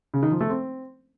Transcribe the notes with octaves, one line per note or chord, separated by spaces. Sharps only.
C#3
D#3
F3
A3
C4